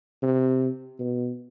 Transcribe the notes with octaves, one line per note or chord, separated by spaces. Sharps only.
C3
B2